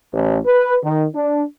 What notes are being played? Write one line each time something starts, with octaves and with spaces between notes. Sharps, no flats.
A1
B4
D#3
D4